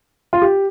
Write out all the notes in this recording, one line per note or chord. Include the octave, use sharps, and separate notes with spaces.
F4
G4